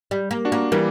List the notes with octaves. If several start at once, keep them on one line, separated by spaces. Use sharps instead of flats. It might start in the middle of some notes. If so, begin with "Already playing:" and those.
G3
A#3
D4 F#4
A#3
E3 G3 A#3